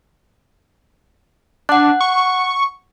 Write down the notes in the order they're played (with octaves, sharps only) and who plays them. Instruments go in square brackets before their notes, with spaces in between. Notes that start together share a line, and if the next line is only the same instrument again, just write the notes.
[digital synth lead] D4 [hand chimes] F#5 F#6
[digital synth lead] C#6